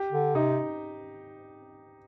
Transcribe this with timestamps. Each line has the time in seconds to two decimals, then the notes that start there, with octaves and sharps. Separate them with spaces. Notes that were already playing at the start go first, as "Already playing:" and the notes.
Already playing: G4
0.13 D3
0.35 C3 D#4